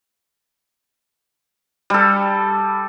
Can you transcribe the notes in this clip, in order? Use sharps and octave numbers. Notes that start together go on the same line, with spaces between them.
G3 A4